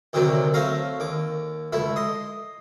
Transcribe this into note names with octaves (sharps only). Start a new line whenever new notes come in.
D2 A2 C3 D#3 F#3
A3 C4 C#4 F5 A#5
D#2 D6
C#2 A3 E4
D#5 C6